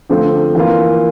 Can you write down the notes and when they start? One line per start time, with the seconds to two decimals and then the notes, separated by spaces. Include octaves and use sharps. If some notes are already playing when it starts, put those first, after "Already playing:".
0.09 D3 F3 A3 C4 F4
0.55 E3 A#3 F4